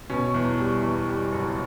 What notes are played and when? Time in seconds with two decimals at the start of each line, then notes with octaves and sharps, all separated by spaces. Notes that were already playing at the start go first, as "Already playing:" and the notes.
0.10 B2 C#4
0.34 E2
0.59 G3
0.83 E2
1.08 G3
1.32 F#1